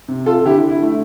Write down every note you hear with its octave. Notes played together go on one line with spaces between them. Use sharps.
C3
F4 A4
D3 E4 G4
E4
A3